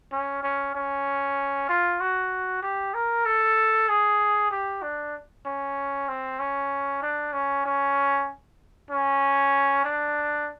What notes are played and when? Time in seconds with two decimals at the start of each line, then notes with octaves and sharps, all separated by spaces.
0.12 C#4
0.43 C#4
0.75 C#4
1.69 F4
2.00 F#4
2.62 G4
2.94 A#4
3.25 A4
3.88 G#4
4.51 G4
4.82 D4
5.45 C#4
6.08 C4
6.39 C#4
7.02 D4
7.33 C#4
7.65 C#4
8.90 C#4
9.84 D4